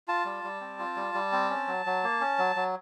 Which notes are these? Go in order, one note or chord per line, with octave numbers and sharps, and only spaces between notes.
F4 A5
G3
G3
C4
F4
G3
G3
C4
C#4
F#3
F#3
A#3
C#4
F#3
F#3